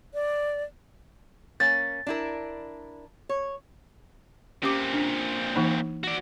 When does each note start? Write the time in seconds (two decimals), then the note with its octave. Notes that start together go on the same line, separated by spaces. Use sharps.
0.14 D5
1.60 A#3 C#4 A6
2.07 D4 E4 A#4
3.29 C#5
4.63 A#2 C4 C#4 G4 D6
4.93 D4
5.56 E3 A#3 D#4
6.04 F#4 D5